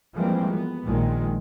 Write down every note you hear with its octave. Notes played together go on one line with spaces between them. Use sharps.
E3 F3 G3 G#3 A#3 C4
B3
A#1 A#2 D#3 G#3